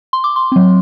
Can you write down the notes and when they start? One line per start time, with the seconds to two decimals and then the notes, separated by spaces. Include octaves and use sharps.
0.13 C6
0.24 D6
0.36 C6
0.52 F#3 C4